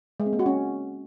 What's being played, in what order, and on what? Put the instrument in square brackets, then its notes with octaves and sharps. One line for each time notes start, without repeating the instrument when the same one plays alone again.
[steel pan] G#3
C4
A#3
F#4
C#4